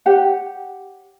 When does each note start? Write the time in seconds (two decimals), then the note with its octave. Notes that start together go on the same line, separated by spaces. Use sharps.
0.06 G4 C#5 F#5